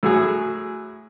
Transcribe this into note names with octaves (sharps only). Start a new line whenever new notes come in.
A2 F#3 G#4